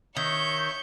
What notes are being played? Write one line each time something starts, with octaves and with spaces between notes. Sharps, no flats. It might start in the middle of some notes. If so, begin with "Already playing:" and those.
D#3 C#5 E5 C#6 G6